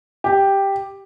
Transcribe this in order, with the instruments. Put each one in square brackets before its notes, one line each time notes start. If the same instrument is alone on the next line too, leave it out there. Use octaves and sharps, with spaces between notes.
[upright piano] G4